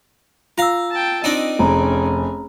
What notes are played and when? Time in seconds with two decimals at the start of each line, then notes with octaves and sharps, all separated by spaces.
0.58 F4 F5 A#5 E6
0.91 G5 A5
1.24 C4 D4 D#4 D#5
1.59 F1 C#4 G#4 A#5